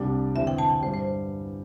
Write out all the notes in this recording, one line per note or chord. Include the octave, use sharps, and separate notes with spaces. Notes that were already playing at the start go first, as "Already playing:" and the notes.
Already playing: C2 C3 G3 D4 G4
E1 E2 D3 C4 E5
G5
A5
G5
G2 G3 C5
C5